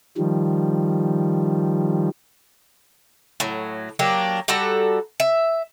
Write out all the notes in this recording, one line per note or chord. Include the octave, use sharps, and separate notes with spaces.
D#3 F3 G3
A2 F#3
F#3 A#3 D4 G4
G3 F#4 A4 A#5
E5